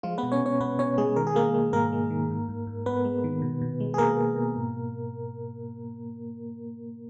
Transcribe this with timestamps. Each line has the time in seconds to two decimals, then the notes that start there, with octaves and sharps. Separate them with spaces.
0.03 F3 G#3 F4
0.18 B3 B4
0.23 B2
0.32 C#4 C#5
0.42 B2 C#4 C#5
0.60 B2 B3 B4
0.79 B2 C#4 C#5
0.98 B2 G#3 G#4
1.16 D#3 A#4
1.27 G#4
1.35 G#3 A#3 A#4
1.54 G#3
1.73 G#2 A#3 A#4
1.92 G#3
2.10 D#3
2.30 G#2
2.49 G#2
2.67 G#2
2.86 G#2 B3 B4
3.05 G#3
3.24 D#3
3.42 B2
3.61 B2
3.80 G#3
3.94 G#4
3.98 B2 A#3 A#4
4.18 B2
4.36 B2
4.56 G#2